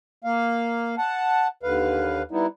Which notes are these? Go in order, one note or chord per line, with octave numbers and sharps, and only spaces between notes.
A#3 F5
F#5 A5
D#2 D3 B4 F5
G3 B3 D#4 E4